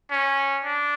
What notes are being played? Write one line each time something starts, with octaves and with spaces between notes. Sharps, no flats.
C#4
D4